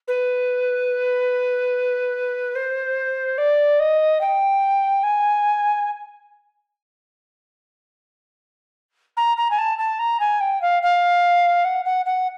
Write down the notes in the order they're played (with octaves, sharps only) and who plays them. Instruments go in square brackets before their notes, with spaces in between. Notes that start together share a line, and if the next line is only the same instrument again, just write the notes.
[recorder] B4
C5
D5
D#5
G5
G#5
A#5
A#5
G#5
A5
A5
A#5
G#5
G5
F5
F5
F#5
F#5
F#5